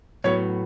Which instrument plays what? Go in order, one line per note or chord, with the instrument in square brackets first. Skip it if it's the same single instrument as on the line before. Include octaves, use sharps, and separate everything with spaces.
[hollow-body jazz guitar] A2 F#3 B3 [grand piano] C#5